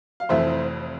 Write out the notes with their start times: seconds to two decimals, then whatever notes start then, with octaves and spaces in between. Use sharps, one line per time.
0.20 F5
0.29 F1 F2 E3 A3 C5 E5